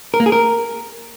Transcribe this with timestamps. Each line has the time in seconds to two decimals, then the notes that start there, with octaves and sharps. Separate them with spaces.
0.14 A#4
0.20 A#3
0.26 G#4
0.32 A#4